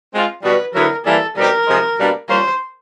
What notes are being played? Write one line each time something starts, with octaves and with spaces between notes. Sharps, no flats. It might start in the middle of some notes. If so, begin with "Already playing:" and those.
G#3 C4 F4
B2 G3 B3 D4 F#4 B4
D3 F#3 B3 E4 A#4
E3 G3 A#3 A4
B2 G3 C4 D#4 G4 A#4
C3 F3 G#3
B2 G3 A#3 D4
G3 A#3 C#4 F4 C5